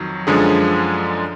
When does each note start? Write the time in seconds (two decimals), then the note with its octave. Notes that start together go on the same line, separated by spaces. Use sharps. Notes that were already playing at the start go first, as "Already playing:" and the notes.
Already playing: F2 D#3 F#3
0.27 F#2 D3 F3 G#3 G#4